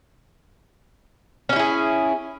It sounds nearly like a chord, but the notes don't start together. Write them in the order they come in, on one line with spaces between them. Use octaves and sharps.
C#4 F#4 E4 G#4